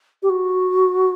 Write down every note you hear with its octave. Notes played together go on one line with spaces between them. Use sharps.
G4
F#4